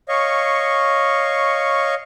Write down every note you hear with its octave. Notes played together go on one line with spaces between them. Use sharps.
C#5 D#5 F5 C#6